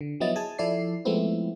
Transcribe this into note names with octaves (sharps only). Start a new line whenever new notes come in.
D3
F3 F#3 B3 E4 D#5 A6
G#4 G#5 A5
F3 E4 A4 D5 C7
F3 G#3 A3 B3 C4 E4